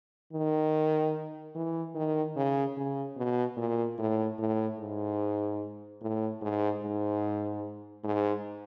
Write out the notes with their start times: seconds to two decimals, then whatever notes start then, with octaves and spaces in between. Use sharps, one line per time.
0.33 D#3
1.55 E3
1.95 D#3
2.36 C#3
2.77 C#3
3.17 B2
3.57 A#2
3.99 A2
4.38 A2
4.79 G#2
6.01 A2
6.42 G#2
6.82 G#2
8.04 G#2